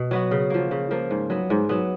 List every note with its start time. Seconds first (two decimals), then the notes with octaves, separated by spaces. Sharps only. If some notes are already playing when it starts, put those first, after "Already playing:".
Already playing: B2
0.11 F#3 B3 F#4
0.31 C#3
0.50 F3 A#3
0.71 C#3
0.91 F3 A#3
1.11 G#2
1.30 F#3 B3
1.50 G#2
1.69 F#3 B3